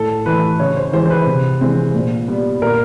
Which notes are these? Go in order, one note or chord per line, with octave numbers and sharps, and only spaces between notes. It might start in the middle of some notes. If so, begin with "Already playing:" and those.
Already playing: A2 A4
E3 A3 B4
C#3 C#5
C5
E3 G#3 C5
C5
B4
C3
E3 G#3 C4
A#2
G3 B3
A#2 A#4